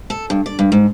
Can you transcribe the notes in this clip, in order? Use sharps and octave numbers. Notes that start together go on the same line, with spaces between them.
A4
G2
D5
G2
G#2